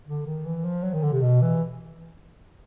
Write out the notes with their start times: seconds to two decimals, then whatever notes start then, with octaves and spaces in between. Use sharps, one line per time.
0.07 D3
0.26 D#3
0.45 E3
0.64 F3
0.83 F#3
0.93 D#3
1.03 D3
1.12 C3
1.22 B2
1.41 E3